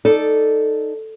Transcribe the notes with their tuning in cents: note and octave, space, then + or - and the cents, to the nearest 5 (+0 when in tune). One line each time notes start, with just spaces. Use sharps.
D#4 +0 A4 +0 D5 +0